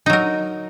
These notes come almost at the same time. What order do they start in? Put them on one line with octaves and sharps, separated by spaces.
D#4 F#3 A#4